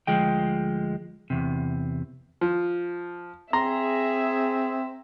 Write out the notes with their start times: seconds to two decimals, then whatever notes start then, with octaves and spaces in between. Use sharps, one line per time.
0.07 D2 F3 G#3 G5
1.30 E2 C3
2.41 F3
3.53 C4 G#4 E5 A#5 C6